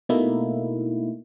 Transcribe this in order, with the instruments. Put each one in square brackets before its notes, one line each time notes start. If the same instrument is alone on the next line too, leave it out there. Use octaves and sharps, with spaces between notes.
[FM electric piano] B2 A3 A#3 D#4 E4